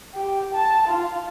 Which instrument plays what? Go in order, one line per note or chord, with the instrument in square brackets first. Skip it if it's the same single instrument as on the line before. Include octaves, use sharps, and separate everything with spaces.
[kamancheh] G4
A5
F4